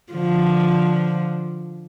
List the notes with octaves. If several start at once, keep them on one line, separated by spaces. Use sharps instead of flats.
D3 F3